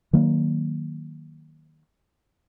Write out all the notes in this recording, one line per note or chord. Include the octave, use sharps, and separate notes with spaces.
D#3 F#3 A#3